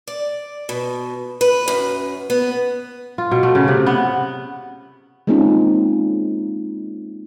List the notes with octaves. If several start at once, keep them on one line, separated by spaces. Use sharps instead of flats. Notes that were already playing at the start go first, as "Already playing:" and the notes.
D5
B2
B4
F#2
B3
F4
B2
A3
C#3
C3
B3
G#3 A#3 C4 C#4 D#4 F4